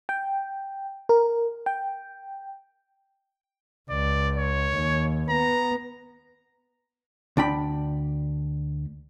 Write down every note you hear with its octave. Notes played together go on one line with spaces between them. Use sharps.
G5
A#4
G5
C#2 D5
C#5
D#2
B3 A#5
D2 D4 G5 B5